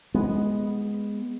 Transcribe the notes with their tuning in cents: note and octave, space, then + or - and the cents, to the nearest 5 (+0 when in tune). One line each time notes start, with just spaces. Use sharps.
G#3 +0 B3 +0